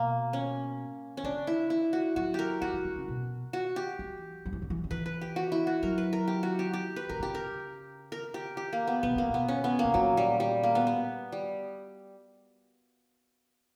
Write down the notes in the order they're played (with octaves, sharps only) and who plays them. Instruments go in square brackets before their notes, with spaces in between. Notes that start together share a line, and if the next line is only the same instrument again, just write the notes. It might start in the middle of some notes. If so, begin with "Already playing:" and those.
Already playing: [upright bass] B2 [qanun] A#3
[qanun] C#4
C#4
[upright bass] C#3 [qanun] D4
[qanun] E4
E4
F#4
[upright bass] F#3 [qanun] F#4
[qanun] G4 A#4
[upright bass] F#3 [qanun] F#4
[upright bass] E3
D3
C#3
B2
[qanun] F#4
G4
[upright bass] E3
F#3
E3
D3
E3
D3
[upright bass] E3 [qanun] B4
[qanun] B4
G4
F#4
E4
F#4
[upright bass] F#3 [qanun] A#4
[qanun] B4
A#4
G4
F#4
G4
G4
B4
[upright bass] D3 [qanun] A#4
[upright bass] C#3 [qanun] G4
[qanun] A#4
A#4
G4
G4
A#3
B3
[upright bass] B2 [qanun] B3
[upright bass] C#3 [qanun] A#3
[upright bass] B2
[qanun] B3
C#4
B3
[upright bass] B2 [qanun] A#3
[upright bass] A#2 [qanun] F#3
[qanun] G3
G3
A#3
B3
B3
G3